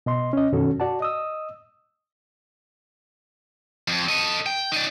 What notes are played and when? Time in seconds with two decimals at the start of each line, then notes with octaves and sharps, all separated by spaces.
0.06 B2 D#5 C6
0.33 C#4 D#5
0.53 F#2 B2 D#3 C#4 F#4 A4
0.80 F#4 D5 F#5 A5
1.00 D#5 D#6 E6
3.88 F2
4.09 A4 D#5
4.46 G5
4.72 D#4 D5